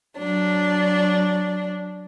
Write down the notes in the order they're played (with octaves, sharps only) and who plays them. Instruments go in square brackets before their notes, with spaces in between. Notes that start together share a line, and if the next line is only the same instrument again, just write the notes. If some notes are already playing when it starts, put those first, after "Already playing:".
[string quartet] F#3 D4